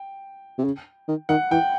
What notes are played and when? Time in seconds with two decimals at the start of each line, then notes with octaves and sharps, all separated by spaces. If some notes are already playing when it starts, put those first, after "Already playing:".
Already playing: G5
0.59 C3
0.65 C#3
1.08 D#3
1.29 D#3 F#5
1.51 E3 G5